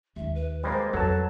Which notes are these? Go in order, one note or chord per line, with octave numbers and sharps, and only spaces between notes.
D#2 E5
B4
G3 G#3 A#3 C5
F2 F#3 G3 A4 A5